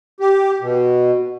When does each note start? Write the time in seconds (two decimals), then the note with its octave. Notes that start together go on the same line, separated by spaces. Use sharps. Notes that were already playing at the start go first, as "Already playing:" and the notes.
0.20 G4
0.61 B2